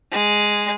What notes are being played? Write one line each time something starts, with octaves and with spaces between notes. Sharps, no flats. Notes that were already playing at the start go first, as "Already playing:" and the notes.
G#3